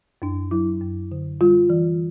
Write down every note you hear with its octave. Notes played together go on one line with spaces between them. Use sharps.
F#2 D4
F#3 E4
F#2
D3
G3 F4
E3